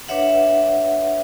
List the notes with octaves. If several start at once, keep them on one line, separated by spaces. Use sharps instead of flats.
D4 B4 C#5 E5 F#5